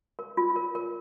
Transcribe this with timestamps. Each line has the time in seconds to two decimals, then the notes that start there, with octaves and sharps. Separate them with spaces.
0.19 A#4
0.37 F4
0.56 A#4
0.75 A#4